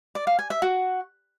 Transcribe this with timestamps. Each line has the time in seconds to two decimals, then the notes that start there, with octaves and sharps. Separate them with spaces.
0.15 D5
0.27 F5
0.39 G#5
0.50 E5
0.62 F#4